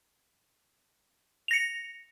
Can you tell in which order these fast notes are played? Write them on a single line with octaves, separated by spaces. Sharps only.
F7 A#6 C#7